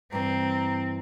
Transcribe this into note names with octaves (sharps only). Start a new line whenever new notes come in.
G2 E3 C4 A#5